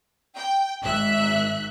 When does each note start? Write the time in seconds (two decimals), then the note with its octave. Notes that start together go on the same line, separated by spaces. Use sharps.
0.36 G5
0.84 G#1 G#2 E5 F#6